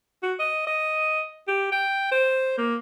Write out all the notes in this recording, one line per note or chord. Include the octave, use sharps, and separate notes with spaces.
F#4
D#5
D#5
G4
G5
C5
A#3